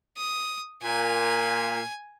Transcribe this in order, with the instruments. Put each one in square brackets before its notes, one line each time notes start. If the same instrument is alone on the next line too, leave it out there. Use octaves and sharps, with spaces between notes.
[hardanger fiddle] D#6
[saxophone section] A#2 [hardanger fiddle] G#5